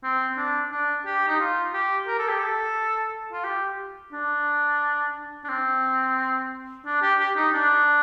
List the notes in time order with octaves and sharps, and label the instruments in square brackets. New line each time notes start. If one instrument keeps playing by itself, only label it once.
[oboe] C4
D4
D4
G4
D#4
F4
G4
A#4
A4
G4
A4
F4
G4
D4
D4
C4
D4
G4
G4
D#4
D4